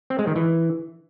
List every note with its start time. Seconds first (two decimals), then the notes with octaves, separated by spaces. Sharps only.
0.10 C4
0.19 G#3
0.27 D#3
0.36 E3